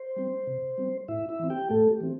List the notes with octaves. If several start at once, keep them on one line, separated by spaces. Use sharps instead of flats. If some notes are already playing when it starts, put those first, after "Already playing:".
Already playing: C5
G3 C4
C3
G3 C4
A2 E4 E5
E4 E5
E3 C4
G4 G5
A2 A3 A4
G4
E3 C4